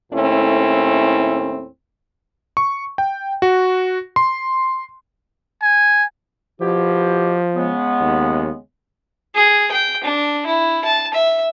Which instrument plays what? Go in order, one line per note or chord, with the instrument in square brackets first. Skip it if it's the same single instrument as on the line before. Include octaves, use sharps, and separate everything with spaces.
[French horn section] D#2 A2 A3 C4 C#4 E4
[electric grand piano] C#6
G5
F#4
C6
[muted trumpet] G#5
[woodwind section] B2 E4 G4 [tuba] F3
[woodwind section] C#3 G#3 B3
[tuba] D#2
[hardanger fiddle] G#4
G5
D4
E4
A5
E5